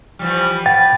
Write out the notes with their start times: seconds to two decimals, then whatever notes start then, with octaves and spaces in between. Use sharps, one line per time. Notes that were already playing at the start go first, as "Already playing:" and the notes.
0.19 E3 F3 G3
0.66 B4 F#5 G5 A6